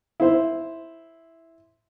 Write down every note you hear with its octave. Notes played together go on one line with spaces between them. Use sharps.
E4 C5